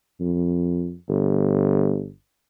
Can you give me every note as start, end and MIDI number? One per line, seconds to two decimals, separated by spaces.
0.20 0.94 41
1.08 2.09 31